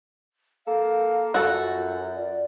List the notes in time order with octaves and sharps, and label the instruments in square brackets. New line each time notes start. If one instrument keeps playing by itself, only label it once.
[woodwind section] A#3 A4 [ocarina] F5
[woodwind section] F#2 [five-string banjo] F#4 A4
[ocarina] F4
D5